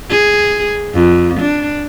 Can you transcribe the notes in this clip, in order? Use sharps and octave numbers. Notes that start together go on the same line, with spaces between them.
G#4
F2
D4